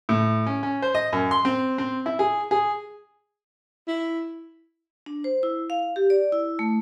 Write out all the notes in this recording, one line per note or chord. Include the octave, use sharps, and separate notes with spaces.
A2
C#4
C#4
C5
D#5
F#2
C6
C4
C4
E4
G#4
G#4
E4
D4
C5
E4
F5
G4
D5
E4
A3